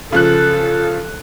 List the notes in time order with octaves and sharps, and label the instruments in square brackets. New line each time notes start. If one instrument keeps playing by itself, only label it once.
[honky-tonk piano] C#3 F3 F#6 [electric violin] A4